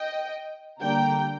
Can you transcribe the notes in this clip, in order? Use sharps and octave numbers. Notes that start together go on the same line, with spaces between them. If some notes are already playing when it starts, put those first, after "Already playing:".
Already playing: D#5 G5
D3 G3 A#3 D4 G5 A#5